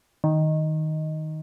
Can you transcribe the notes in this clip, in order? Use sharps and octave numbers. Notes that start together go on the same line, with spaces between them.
D#3